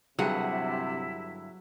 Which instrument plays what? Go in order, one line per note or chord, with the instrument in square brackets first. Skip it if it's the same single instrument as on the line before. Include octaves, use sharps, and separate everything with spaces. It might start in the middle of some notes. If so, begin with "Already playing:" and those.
[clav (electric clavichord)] G1 G2 [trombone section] C3 [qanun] F#3 G#4 F#5 [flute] E4